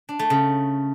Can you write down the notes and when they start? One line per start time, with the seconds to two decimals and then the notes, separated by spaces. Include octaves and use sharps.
0.09 D4
0.19 A3
0.30 C#3